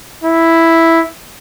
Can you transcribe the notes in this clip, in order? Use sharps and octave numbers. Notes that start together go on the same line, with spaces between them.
E4